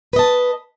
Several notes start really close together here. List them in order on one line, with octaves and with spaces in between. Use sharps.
B4 D#5 A5